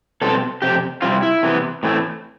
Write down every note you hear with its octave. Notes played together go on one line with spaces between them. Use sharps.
B2 G3 C4 A4
F2 C3 G4
C3 G3 C4 F4
E4
C3 E3 B3
A2 E3 A3 C4